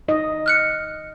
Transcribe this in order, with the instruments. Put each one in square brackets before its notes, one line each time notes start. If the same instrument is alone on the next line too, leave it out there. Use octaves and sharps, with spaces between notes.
[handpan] D#4 D#5
[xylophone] F6 F#6 C#7